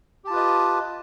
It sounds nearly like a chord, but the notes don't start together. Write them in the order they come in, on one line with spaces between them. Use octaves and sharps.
G4 A5 F4 B4 D#5